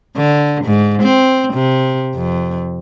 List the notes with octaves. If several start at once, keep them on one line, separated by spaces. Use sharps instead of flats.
D3
G#2
C4
C3
F2